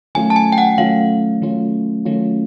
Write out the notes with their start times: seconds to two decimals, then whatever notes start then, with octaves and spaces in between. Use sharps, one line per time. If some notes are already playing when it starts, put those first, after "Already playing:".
0.15 D#3 F#3 A3 C#4 F4 G#5
0.30 A5
0.36 G#5
0.52 G5
0.58 F#5
0.78 D#3 F#3 A3 C#4 F4 F5
1.42 D#3 F#3 A3 C#4 F4
2.05 D#3 F#3 A3 C#4 F4